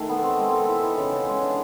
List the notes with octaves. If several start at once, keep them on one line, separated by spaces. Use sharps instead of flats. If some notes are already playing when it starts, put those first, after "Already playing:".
Already playing: D#3 G#3 A3
B3
C4
G#3
A4
E4
E3
C#3
C#3
G#3
D4